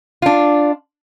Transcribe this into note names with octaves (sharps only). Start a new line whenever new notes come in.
D4 F4